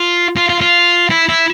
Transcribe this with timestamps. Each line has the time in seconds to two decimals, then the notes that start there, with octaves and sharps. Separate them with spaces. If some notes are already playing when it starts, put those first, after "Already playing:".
Already playing: F4
0.37 F4
0.49 F4
0.61 F4
1.11 E4
1.29 E4